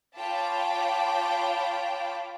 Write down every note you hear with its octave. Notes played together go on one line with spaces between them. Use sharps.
F4 C#5 G5 A5 B5 D6